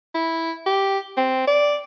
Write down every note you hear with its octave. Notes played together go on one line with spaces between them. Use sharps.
E4
G4
C4
D5